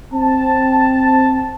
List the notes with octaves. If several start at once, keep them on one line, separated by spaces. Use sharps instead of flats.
C4 A5